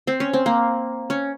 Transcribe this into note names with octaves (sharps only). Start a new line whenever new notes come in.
C4
C#4
C4
A#3
C#4